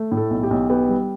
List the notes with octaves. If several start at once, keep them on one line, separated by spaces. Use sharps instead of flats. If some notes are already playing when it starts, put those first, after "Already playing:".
Already playing: A3
A2
A4
B1
G4
B1
B3 G4
G3